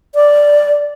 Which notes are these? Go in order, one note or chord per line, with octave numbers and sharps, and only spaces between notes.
D5